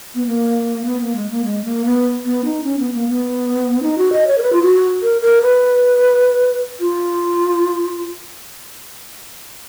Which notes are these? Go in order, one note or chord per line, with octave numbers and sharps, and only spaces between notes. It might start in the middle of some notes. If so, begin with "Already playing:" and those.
B3
A#3
B3
A#3
G#3
A#3
G#3
A#3
B3
B3
D#4
C#4
B3
A#3
B3
D#4
F#4
D#5
C#5
A#4
B4
F4
F#4
A#4
A#4
B4
F4